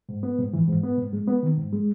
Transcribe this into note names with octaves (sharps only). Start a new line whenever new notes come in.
G#2
B3
G#2
E3
G#2
B3
G#2
G#3
B3
D#3
G#2
G#3